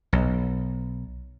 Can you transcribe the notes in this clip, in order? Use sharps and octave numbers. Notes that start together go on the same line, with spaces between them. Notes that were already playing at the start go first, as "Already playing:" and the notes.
B1